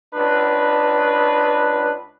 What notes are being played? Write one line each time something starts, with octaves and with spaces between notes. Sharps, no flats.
C#2 D4 B4